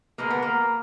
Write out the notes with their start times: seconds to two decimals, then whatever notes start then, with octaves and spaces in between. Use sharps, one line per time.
0.18 B2 G#3 A#3
0.30 B3
0.42 A#3